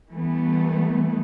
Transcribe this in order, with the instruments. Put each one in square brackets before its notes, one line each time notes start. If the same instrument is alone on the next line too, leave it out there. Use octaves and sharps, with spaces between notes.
[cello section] E3 G3 A3 B3